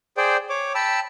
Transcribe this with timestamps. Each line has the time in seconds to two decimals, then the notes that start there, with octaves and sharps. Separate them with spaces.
0.17 G#4 C5 D5 G5
0.49 C#5 D6
0.75 G5 A5 B5 E6